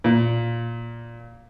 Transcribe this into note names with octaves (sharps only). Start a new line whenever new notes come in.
A#2